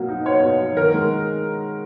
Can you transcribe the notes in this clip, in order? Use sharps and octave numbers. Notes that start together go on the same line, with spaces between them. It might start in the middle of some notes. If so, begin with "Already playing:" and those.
Already playing: B2 F#3 A#3
D#4
B3 C#5
B2
F#3
D#3 A#4
G#3